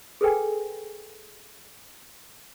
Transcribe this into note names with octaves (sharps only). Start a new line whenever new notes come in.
G#4 A4 B4 G5 G#5